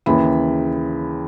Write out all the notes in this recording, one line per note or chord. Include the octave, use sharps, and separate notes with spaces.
D#2 C#3 E3 B5